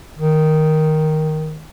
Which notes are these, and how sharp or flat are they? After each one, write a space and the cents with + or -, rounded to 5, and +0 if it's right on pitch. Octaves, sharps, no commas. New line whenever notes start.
D#3 +0